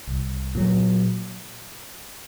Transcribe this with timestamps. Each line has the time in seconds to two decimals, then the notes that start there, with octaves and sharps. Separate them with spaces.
0.07 C2
0.55 A#2 F#3